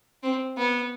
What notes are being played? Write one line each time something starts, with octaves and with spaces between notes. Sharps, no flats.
C4
B3